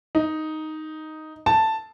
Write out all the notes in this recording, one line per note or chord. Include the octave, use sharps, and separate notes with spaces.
D#4
A5